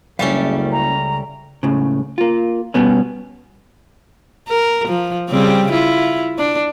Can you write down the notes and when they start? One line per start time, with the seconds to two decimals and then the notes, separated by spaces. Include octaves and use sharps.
0.19 F#1 C#2 G2 G3 A3 C#4 F5
0.72 A#5
1.63 C#2 A2 C#3
2.18 A#3 F4
2.74 B2 G3 B3 C#4
4.48 A#4
4.88 F3
5.29 C#3 G3 C4
5.71 E4 F4
6.38 D4